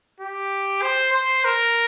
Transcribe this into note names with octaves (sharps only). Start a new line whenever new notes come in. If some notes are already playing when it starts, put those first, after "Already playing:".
G4
C5
C5
A#4